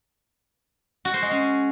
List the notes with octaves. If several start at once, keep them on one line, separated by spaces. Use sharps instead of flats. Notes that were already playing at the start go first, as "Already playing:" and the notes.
F#4
C5
G#3
C#4